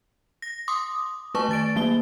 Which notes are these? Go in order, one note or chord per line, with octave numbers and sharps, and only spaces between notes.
A#6
C6 D6 D#6
A3 B4 A5 C#6
D#3 A6 D7
F#3 A#3 G7